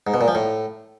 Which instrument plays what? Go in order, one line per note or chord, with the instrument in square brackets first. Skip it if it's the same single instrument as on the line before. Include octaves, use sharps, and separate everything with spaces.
[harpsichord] G#2
B2
A#2
F3
A2